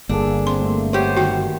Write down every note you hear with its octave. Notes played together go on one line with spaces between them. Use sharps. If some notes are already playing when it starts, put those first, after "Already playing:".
G1 A#3 D4 G#4 A4
C4 C6
A3 A#3
B3 G4 C5 C#5
D#3 F#4 G5